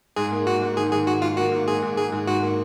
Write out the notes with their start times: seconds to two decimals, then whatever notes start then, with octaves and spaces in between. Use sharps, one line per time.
0.16 G#2 G#4
0.32 A#3
0.46 G#2 F#4
0.62 G#2
0.77 D#3 G#4
0.92 G#2 G#4
1.07 D#3 F#4
1.22 G#2 F4
1.37 A#3 F#4
1.52 G#2
1.67 G#2 G#4
1.82 G#2
1.97 G#2 G#4
2.12 G#2
2.27 G#2 F#4
2.42 A#3